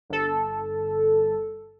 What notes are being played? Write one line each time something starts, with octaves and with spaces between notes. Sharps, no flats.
G1 A4